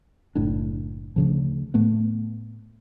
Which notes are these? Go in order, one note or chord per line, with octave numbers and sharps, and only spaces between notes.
F#1 A2 D4
D2 C#3 F3
A2 A3 B3